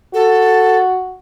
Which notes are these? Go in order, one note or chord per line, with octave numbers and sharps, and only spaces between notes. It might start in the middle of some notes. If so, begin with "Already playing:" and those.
F#4 A4